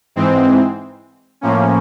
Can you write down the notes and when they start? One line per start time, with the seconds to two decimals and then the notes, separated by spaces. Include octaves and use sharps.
0.16 G#2 E3 G#3 C4
1.41 A2 F3 A#3 C#4